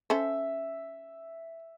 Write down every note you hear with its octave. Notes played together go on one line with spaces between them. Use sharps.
C#4 A4 C5 E5